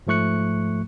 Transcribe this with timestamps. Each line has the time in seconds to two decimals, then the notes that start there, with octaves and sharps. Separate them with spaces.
0.07 G#2 F3 A3 C#6 F#6 C#7